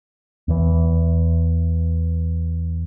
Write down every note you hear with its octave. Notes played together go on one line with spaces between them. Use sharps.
E2 E3